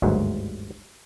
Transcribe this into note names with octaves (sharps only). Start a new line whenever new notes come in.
G1 D2 G#2 D#3 F#3